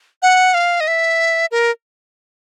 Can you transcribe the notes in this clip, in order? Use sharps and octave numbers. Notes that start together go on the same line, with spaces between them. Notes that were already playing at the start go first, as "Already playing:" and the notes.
F#5
F5
D#5
E5
A#4